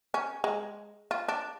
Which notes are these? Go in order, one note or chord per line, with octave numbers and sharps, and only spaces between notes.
C#4
G#3
F4
D4